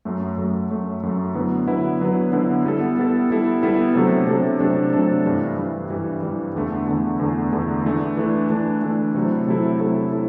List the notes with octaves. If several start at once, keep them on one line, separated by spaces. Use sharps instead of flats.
F#2 F#3 A3
F#2 F#3 A3
F#2 F#3 A3
F#2 F#3 A3
D3 F#3 B3 E4 B4
D3 F#3 B3 E4 B4
D3 F#3 B3 E4 B4
D3 F#3 B3 E4 B4
G3 B3 E4 A4
G3 B3 E4 A4
G3 B3 E4 A4
G3 B3 E4 A4
C3 F#3 A3 D4 A4
C3 F#3 A3 D4 A4
C3 F#3 A3 D4 A4
C3 F#3 A3 D4 A4
G2 E3 G3
G2 E3 G3
G2 E3 G3
G2 E3 G3
E2 D3 A3
E2 D3 A3
E2 D3 A3
E2 D3 A3
E3 A3 D4
E3 A3 D4
E3 A3 D4
E3 A3 D4
C3 F#3 A3 E4 A4
C3 F#3 A3 E4 A4
C3 F#3 A3 E4 A4
E4 A4